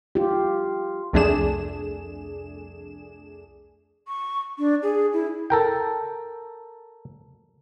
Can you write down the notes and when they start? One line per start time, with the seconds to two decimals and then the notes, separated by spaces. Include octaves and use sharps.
0.15 F4 G4
1.13 C2 F2 A3 D4 G#4 E7
4.08 C#6
4.59 D4
4.83 G#4
5.13 E4
5.50 A4 A#4 G5